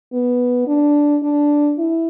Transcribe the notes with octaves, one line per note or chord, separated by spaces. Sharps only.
B3
D4
D4
E4